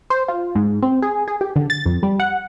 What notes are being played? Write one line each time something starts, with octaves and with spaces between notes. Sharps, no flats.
C5
F4
G#2
C4
G#4
G#4
G4
D3
A6
F2
G3
F#5